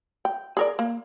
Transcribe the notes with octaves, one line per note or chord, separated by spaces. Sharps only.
G5
G#4 A#4 D5
A#3